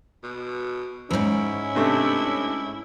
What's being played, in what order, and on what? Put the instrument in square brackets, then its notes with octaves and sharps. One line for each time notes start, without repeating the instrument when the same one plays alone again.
[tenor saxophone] B2
[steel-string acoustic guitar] E2 G#2 [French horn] C#4 [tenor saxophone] E4
[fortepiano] G2 C3 A3